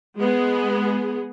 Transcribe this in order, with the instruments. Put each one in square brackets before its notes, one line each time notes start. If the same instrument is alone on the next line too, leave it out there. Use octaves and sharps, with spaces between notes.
[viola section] G#3 B3 G#4